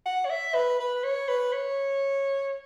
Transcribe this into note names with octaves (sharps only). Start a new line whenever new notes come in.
F#5
C#5
E5
B4
B4
C#5
B4
C#5